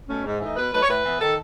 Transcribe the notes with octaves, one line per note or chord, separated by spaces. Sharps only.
B2 A3 C#4
G#2
E3 A3 D#4
B2 B4
F#3 A3 D#4 B4
C#5
A2 B4
E3 B3
D#3 A4